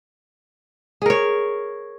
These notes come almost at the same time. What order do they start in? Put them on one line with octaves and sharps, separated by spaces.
G#4 A#4 C#5